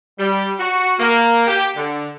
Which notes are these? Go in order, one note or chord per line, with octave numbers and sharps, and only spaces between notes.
G3
F#4
A#3
G4
D3